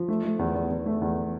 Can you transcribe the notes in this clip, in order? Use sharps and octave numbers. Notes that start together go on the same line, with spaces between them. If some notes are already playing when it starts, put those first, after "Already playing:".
Already playing: F3
A3
A3
E2
E2
E2
A3
E2